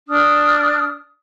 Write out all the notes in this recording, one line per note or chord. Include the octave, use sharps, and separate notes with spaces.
D4 D#6 F6